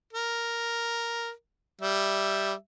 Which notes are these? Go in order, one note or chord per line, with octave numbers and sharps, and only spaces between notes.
A#4
G3 E5